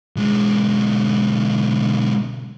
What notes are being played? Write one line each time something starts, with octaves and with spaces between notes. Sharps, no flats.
B1 G#3